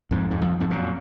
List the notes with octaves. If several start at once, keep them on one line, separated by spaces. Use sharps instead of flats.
F2 G#2
F2 G#2
F2
F2 G#2
F#2 A#2